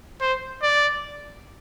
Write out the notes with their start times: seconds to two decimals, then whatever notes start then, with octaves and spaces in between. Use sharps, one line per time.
0.22 C5
0.62 D5